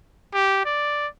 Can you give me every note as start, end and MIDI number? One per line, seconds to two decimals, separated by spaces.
0.34 0.60 67
0.65 1.08 74